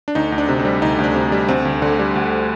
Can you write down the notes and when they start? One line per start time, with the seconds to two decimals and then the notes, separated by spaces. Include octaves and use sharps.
0.08 D4
0.15 D2 D#4
0.32 D2
0.38 D4
0.49 C3
0.59 C4
0.65 G3
0.82 D2 D#4
0.99 D2
1.04 D4
1.15 C3
1.32 G3
1.48 D2 C4
1.65 D2
1.82 D3
1.99 G3
2.15 D2